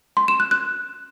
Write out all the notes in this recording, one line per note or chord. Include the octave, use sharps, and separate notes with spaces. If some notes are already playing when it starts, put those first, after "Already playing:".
C6
E7
F#6
F#6